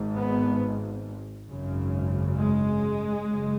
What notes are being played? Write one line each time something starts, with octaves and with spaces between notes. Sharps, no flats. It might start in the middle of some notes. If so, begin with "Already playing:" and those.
Already playing: G#1 G#2
B3
G#1 F#2 C#3
G#3
F#1 F#2 C#3